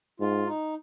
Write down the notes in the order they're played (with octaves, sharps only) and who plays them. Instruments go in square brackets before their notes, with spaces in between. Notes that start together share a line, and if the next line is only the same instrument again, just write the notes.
[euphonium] G#2 [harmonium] F4
[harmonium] D#4